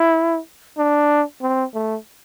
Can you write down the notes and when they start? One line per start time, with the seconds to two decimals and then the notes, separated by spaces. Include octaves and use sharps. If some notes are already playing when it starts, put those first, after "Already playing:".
Already playing: E4
0.78 D4
1.42 C4
1.74 A3